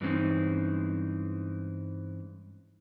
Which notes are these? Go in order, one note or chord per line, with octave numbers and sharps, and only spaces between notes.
G2 E3 G#3 C4 C#4 D#4